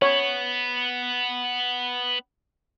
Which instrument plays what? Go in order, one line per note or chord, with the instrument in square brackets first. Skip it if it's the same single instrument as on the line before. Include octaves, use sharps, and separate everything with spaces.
[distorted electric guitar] B3 [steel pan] C#5